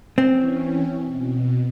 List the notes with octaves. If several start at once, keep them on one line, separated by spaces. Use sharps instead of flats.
E3 C4 C#4
B2